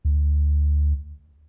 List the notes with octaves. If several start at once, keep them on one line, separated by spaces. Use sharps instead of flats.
D2